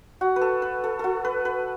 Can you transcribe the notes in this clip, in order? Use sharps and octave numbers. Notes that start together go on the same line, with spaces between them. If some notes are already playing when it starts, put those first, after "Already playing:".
F#4
B4
A4
B4
A4
F#4 A4
B4
B4